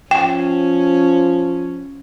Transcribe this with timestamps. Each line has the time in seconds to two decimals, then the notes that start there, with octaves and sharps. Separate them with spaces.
0.11 F3 C#4 G5